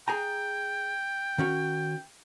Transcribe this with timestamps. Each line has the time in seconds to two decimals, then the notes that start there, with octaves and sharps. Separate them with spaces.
0.08 G#4 G5 G#5 A#5
1.38 D#3 C#4 F#4